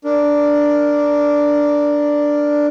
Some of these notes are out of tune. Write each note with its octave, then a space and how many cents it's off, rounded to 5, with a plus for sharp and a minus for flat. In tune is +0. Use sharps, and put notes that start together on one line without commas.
D4 +0 A#4 +0